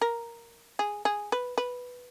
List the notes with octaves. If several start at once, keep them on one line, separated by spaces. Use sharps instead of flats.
A#4
G#4
G#4
B4
B4